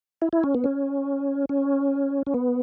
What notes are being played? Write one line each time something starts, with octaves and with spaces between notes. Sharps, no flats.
E4
E4
C#4
B3
C#4
C#4
C#4
B3